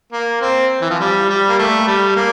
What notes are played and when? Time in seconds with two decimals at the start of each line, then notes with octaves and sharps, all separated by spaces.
0.13 A#3
0.41 C4
0.81 E3
0.90 F3
1.00 G3
1.30 G3
1.49 A#3
1.58 A3
1.87 G3
2.16 A#3